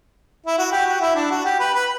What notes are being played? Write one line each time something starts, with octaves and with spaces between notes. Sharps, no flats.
E4
F#4
G4
F#4
E4
D4
F#4
G4
B4
B4